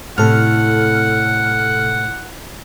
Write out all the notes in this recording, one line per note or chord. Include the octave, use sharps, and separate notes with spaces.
A2 C3 A4 F#5 F6